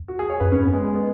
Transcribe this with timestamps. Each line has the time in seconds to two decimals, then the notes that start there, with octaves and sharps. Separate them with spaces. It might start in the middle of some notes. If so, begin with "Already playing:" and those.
Already playing: E2
0.08 F#4
0.19 G#4
0.30 C#5
0.40 F#2 B4
0.52 C#4
0.57 G#2
0.62 B3
0.73 G#3
0.84 G#3
0.94 B3